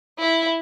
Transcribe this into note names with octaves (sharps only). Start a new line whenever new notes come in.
E4